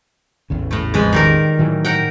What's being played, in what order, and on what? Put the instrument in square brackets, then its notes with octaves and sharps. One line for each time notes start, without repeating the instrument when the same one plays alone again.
[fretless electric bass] A1 E2 C#3
[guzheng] A2 A3
F2 G#3 B4
D#3 G3 A#4
[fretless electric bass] A2 E3 F#3
[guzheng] A#4 F#5 G5